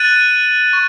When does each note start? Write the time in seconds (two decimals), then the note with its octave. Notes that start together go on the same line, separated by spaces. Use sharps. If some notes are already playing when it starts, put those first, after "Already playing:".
Already playing: F#6 A6 D#7 F#7
0.73 C#6